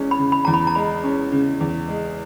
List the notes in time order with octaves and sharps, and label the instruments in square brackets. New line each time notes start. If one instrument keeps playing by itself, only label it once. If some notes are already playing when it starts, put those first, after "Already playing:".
Already playing: [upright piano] E2 G#3 C#4
[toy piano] B5
[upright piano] C#3
[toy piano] B5
[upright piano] E2 [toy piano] A#5
[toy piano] B5
A#5
[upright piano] G#3 [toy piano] B5
[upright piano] C#4
C#3
E2
G#3